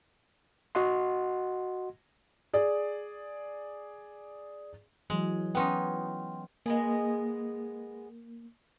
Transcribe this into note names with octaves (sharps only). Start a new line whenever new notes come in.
F#4 D#5 F#5 C6
G#4 D5
E3 F#3 G#3
B3 C#4 D#4 G5 C6
G#3 A#3 B3 G#4